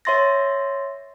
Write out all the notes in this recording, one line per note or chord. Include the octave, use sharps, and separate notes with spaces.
C#5 E5 C6 A6 A#6